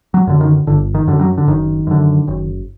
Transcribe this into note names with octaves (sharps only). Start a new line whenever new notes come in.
F#3
F#2 D3
D#3
G1 D3
D#3
F#2 D3
F#3
D3
F#1 D#3
F#2 D3
F#1